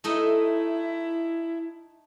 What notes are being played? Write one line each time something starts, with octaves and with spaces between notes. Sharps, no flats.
A3 D#4 E4 D#5